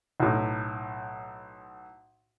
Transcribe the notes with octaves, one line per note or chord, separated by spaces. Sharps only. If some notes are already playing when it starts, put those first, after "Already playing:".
B1 A2